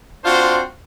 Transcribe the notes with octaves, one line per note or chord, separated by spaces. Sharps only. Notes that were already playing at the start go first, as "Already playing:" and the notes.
C4 D4 F4 F#4 C5